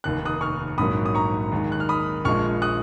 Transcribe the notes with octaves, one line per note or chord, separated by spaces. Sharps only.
F1 D#2 D#3 F#6
D#6 F#6
C#6 F6
A#1 G#2 F#3 A#3 B5 D#6
D#6
A#5 C#6
D#2 D#3 G#3
F#6
F6
B5 D#6
A#1 A#2 F3 G#3 C#6 F6
D#6 F#6